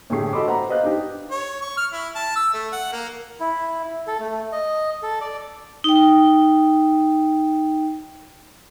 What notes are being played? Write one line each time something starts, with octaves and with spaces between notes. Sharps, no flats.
A2 D3 G4 G#4 C#6 C7
F#4 A4 D#5 B5 C6 D6
B4 C5 F#5 A#5 B5
B4 C5 D#5 F5 F#6 G6
D4 D#4 G4
C#5
C#6
F6
E4
A5
E6
A3
F#5
A#3
E4
A4
A3
D#5
A4
D5
D#4 G5